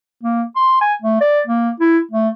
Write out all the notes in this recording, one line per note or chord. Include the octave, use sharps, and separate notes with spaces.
A#3
C6
G#5
A3
D5
A#3
E4
A3